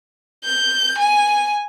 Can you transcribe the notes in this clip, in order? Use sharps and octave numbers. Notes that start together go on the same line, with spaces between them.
G6
G#5